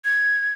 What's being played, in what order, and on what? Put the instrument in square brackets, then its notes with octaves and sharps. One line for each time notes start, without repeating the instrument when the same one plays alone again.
[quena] G#6